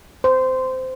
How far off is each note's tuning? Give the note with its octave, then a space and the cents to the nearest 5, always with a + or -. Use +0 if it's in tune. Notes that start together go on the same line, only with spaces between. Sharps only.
C5 -15